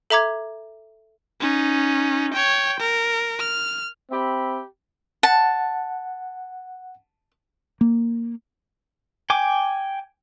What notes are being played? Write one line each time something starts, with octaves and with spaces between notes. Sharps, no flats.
A4 E5 A#5 D6 G#6
C#4 D#4
C#5 G5
A#4
F6
C4 G4 E5 B5
F#5 A5
A#3
G5 G#5 D6